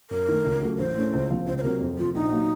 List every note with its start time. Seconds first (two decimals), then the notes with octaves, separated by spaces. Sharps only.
0.10 F#2 A#4
0.28 D#3 A3
0.45 C#2
0.62 C#3 F#3 A3
0.78 A1 C5
0.96 A2 A3 C#4
1.13 C#2
1.30 C3 F3 A#3 F4
1.46 C#2 C5
1.58 C5
1.63 C3 F#3 A#4
1.80 F2
1.97 C3 F3 F4
2.14 A#1 D#4
2.31 A#2 F#3 A#3